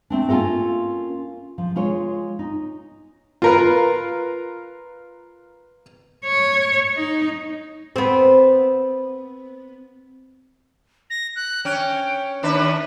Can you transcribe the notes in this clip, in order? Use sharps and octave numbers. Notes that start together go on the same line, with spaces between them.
A3 C4 D4
A#3 C#4 F4 A4 A#4
F3
G#3 F4 C#5
D#4
F4 A#4 B4
C#5
D#4
B3 C4
A#6
F#6
C#4 G5
D#2 D4 B4 E5